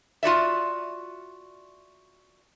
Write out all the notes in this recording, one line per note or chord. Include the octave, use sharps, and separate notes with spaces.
F4 F#4 D5 E5